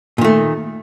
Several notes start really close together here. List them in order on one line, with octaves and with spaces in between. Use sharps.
A#2 D#3 A3